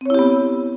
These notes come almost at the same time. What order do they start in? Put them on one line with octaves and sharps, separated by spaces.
C4 C#5 E4 G4 B3